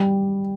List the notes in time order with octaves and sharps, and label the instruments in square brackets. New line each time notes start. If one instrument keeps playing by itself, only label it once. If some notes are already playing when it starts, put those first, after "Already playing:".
Already playing: [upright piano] G3